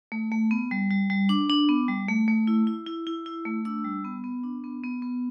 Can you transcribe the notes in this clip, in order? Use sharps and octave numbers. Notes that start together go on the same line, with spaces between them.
A3
A3
B3
G3
G3
G3
D4 D6
D4
B3
G3
A3
A3
E4
E4
E4
E4
E4
A3
D4 E6
G3
B3
B3
D4
B3
B3
B3